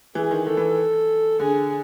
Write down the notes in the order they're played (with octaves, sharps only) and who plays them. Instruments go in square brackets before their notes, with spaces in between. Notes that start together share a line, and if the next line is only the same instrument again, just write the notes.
[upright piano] E3 [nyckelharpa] G#4
[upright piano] D#3
[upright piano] D#3 [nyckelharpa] A4
[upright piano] E3
[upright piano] D3 [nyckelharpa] G#4